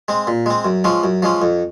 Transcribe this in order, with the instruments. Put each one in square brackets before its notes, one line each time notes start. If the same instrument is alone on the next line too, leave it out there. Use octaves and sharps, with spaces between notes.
[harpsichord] G#3 C4
A#2
G#3 C4
F#2
F3 G#3 C#4
F#2
F3 G#3 C#4
F2